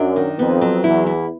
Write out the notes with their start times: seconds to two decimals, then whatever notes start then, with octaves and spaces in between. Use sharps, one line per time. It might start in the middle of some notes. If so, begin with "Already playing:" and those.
Already playing: F#2 D4
0.16 D#3
0.39 F2 B3
0.61 F#3
0.84 E2 E4
1.06 E4